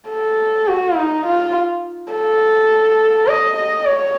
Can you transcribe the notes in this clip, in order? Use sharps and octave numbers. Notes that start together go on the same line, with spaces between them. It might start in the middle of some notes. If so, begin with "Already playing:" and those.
A4
F#4
D#4
F4
A4
D#5
D#5
C#5